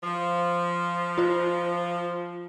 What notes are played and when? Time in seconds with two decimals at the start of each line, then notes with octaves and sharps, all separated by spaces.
0.04 F3
1.18 F4 C5